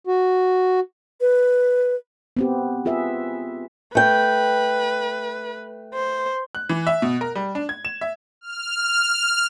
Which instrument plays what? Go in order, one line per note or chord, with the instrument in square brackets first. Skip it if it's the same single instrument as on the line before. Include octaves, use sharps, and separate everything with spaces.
[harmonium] F#4
[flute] B4
[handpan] B3 C4 G4
F4 G#4 B4 E5
[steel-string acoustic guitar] A3 G5 [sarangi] B4
[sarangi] C5
[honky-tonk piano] F#6
E3
E5
B2
A#4
G3
D4
G#6
E7
E5
[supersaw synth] F6